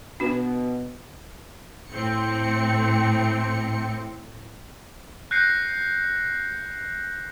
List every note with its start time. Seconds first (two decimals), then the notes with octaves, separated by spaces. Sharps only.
0.20 B2 D4 F#4 B4
1.91 A2 C4 C#7
5.31 F#6 G6 A#6 C7 C#7